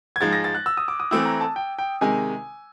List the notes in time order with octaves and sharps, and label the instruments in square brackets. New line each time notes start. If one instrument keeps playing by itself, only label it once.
[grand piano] G#6
[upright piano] G#2 F3 G#3 [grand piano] A6
[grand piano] A#6
A6
F#6
E6
D#6
D6
D#6
[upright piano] E3 A3 C4 E4 [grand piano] E6
[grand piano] A#5
A5
G5
G5
[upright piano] C3 D#3 G#3 [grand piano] G#5